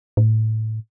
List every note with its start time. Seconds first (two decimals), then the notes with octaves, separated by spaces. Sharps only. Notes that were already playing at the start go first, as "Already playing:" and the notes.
0.17 A2